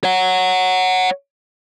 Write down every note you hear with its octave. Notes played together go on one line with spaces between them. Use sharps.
C#5 F#5